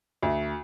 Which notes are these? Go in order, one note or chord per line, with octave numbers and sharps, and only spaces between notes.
D2